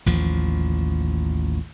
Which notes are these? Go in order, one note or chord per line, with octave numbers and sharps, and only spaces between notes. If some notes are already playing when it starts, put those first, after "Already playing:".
A1 D#2 F3